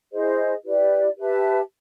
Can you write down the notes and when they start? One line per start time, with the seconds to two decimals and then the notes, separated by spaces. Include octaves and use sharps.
0.12 E4 G#4 C5 D#5
0.65 E4 G4 B4 D5
1.18 G4 B4 E5 A5